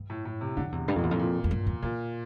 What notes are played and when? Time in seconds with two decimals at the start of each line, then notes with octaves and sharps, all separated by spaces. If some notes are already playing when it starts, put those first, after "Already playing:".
Already playing: G2
0.10 A2
0.25 A2
0.41 C3
0.57 F2 D3
0.72 E2 C3
0.88 G2
0.96 F2
0.99 A#2
1.03 E2
1.09 F2 A2
1.20 A#2
1.44 F2
1.51 G2
1.66 E2
1.83 E2 A#2